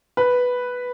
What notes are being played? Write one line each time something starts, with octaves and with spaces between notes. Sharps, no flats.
B4